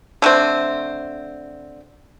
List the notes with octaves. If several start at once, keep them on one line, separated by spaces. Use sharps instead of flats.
D3 A3 C4